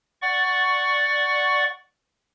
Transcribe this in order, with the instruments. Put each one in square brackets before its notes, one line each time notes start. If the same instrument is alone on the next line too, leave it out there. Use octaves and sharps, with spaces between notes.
[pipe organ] D5 F#5 C#6